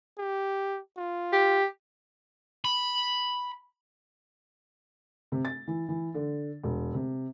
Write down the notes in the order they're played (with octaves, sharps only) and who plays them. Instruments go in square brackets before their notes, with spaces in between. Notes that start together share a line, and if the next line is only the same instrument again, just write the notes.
[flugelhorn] G4
F4
[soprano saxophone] G4
[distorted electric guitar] B5
[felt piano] C3
A6
E3
E3
D3
E1
C3